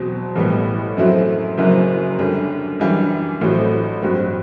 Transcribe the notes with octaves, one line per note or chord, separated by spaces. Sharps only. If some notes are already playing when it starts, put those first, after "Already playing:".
Already playing: E2 B2 F#3 C4
A1 A2 G3 B3
F#2 F#3 A3 C4 E4
F#1 F#2 F#3 C4 E4
F#2 D3 G3 D4
F#2 E3 G3 D4
A1 A2 F#3 A3 C4
G2 F#3 C4